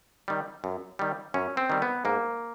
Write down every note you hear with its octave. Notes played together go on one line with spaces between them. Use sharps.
D#3 G3
F#2
D#3 G3
F#2 C#4
C4
D#3 G3
B3
G#2 A#3